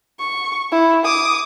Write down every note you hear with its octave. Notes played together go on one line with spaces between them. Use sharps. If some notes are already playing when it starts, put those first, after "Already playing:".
C#6
E4
D6 D#6